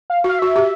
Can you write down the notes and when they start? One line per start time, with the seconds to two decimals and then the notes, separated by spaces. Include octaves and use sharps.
0.10 F5
0.24 F#4 F5
0.39 F#4 E5
0.56 G4